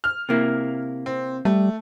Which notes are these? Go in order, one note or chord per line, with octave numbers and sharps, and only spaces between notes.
F6
C3 A#3 E4
C4
G3 A3